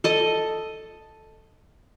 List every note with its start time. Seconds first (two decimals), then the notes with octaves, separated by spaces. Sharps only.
0.04 A4 D#5